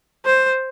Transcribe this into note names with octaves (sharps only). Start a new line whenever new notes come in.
C5